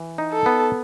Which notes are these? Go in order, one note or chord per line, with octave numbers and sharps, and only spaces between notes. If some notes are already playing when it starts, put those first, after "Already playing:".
Already playing: E3
D#4
A4
B3